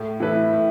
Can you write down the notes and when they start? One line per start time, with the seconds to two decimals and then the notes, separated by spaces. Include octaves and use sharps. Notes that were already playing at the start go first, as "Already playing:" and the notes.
Already playing: A2
0.20 E3 A3 E4 B4
0.53 A2